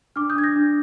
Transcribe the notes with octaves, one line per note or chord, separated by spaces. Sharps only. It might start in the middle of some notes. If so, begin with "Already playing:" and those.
D4 D6 F6
D#6 G6
D4 G#6
G6 A#6
D4